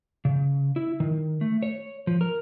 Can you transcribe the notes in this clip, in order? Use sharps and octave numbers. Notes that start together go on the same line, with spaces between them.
C#3
E4
D#3
A3
C#5
F3
A#4